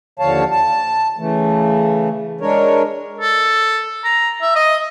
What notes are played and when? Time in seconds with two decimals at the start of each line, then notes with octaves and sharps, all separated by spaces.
0.19 D#2 D3 F3 C#5 F5 A5
0.51 A5
1.18 C#3 E3 A3
2.41 G#3 D4 A#4 C#5
3.21 A4
4.05 A#5
4.42 E5
4.56 D#5